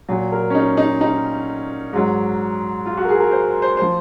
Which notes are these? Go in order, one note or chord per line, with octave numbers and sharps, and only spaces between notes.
A#2 F#3
A#4
C#4
D#4
D#4
D#4
G#2 F#3
F4
F#4
A#4
G#4
A#4
C5
C5
F3 C5